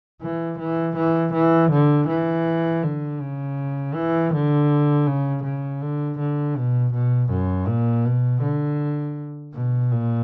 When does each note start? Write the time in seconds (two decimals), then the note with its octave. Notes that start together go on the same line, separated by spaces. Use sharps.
0.22 E3
0.59 E3
0.97 E3
1.34 E3
1.72 D3
2.08 E3
2.83 D3
3.21 C#3
3.94 E3
4.33 D3
5.07 C#3
5.44 C#3
5.82 D3
6.19 D3
6.56 B2
6.94 B2
7.30 F#2
7.67 A#2
8.05 B2
8.42 D3
9.54 B2
9.92 A#2